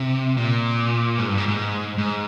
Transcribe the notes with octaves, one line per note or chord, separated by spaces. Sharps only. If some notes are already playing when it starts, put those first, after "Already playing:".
Already playing: C3
A#2
G#2
G2
G#2
G#2
G#2